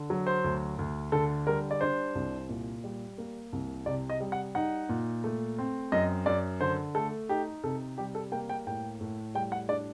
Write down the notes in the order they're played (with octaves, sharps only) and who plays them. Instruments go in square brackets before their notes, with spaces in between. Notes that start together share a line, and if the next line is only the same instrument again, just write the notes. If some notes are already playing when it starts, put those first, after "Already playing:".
Already playing: [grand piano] D3
F#3
C5
D2
D2
D3 A4
G3 A#4
D5
D4 C5
C2
A#2
G3
A#3
C2
C3 D5
D#5
G3
F#5
D#4 F#5
A#2
A3
C4
F#2 D#5
F#2 D5
D3 C5
A3 A4
D#4 G4
C3 A4
G3 G4
A4
A#3 G5
G5
A2 G5
A2
G3 G5
F#5
D4 D5